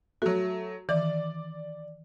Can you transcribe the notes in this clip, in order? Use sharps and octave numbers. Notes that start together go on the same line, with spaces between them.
F#3 A3 F#4
D#3 E3 D5